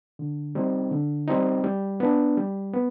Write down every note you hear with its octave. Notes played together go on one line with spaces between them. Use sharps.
D3
G3 C4 D#4
D3
G3 C4 D#4
G3
B3 D4
G3
B3